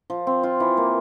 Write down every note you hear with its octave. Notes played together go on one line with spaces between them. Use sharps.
F3
C4
F4
E3
A#3